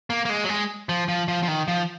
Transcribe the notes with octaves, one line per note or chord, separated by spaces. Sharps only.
A#3
A#3
G#3
F#3
G#3
F3
F3
F3
F3
D#3
F3